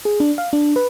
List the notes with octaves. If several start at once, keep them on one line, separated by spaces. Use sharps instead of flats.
G#4
D4
F5
D4
B4